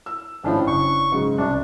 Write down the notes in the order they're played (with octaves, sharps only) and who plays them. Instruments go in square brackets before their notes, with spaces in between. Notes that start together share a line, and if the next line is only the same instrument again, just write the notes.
[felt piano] E6
[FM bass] G#1 [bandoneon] A2 F3 [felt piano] C#4 D4 E4
[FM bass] F#1 [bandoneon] C#6
[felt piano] G#2 C#3 F#3
[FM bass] C2 [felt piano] F#2 [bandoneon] D4